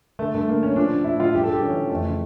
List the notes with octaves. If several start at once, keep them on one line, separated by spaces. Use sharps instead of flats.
D3 A3
G2 A3
D3 A#3
G2 C#4
F3 D4
A2
A2 E4
F3 F4
G2 G4
A4
G2
G4
E3 C#4
E3
F2 A3
C#3